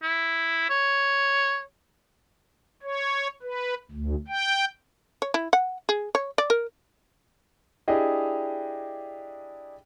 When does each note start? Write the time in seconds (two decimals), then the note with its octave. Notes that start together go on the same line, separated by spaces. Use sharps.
0.03 E4
0.70 C#5
2.83 C#5
3.43 B4
3.91 D2
4.28 G5
5.22 C#5
5.34 E4
5.53 F#5
5.89 G#4
6.15 C#5
6.38 D5
6.50 A#4
7.88 D4 E4 G4 G#4 D#5